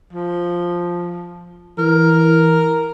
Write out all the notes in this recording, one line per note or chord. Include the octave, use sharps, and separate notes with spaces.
F3
E3 A#4